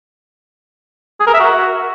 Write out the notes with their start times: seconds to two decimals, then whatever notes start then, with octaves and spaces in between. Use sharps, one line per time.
1.20 G#4
1.27 A#4
1.33 E5
1.40 F#4